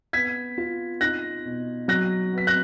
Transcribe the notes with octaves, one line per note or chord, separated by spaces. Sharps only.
B3 G#6 B6
F4
D#4 F#6 A#6
B2
F#3 F#6 A#6
B3
B6
F#6 A#6